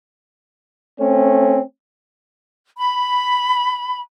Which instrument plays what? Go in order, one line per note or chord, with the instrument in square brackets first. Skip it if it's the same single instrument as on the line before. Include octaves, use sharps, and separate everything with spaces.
[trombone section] A3 C4 C#4
[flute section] B5